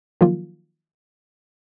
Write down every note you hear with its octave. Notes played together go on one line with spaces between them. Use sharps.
D#3 F3 F#3 A#3 F4